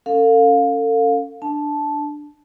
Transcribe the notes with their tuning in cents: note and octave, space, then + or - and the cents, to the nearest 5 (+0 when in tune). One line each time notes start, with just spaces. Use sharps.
C#4 +0 A4 +40 F5 +20
D4 +5 A5 -10